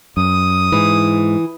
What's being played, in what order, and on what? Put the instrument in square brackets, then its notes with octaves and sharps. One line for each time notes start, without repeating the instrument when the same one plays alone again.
[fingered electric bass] F#2 [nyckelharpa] D#6
[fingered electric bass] G#2 [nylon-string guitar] E3